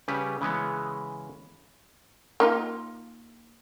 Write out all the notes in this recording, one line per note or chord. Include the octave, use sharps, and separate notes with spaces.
C#3 G3 C#4 G4 B4
C#3 E3 G#3 B3 C#4
A#3 D#4 F4